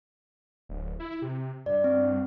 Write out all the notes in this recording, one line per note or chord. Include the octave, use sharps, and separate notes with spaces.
D1
E4
C3
G2 D5
C4